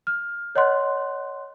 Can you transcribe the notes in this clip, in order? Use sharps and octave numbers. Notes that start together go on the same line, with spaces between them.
F6
A#4 C#5 D#5 F#5 C6 F#6